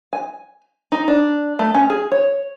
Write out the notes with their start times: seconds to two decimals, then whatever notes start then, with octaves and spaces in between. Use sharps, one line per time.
0.13 G#5
0.92 D#4
1.08 D4
1.59 A3
1.74 C#4
1.90 G#4
2.12 C#5